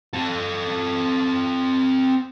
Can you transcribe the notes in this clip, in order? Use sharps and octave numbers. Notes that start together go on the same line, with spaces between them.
C4 A4